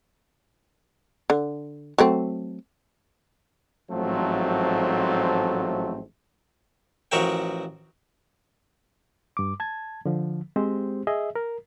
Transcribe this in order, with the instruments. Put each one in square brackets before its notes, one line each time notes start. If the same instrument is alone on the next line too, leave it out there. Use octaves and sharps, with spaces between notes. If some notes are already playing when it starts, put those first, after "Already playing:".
[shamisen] D3
F#3 A3 C4
[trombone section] A1 G#2 F3 F#3 A3 C4
[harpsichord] A1 F3 F#4 A#4 E5 G5
[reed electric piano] G2 D6
A5 G#6
D3 F3
G#3 C4 G4 C5
G#4 D#5 E5
A#4